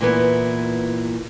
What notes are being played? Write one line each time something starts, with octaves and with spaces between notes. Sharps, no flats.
A#2 E3 B3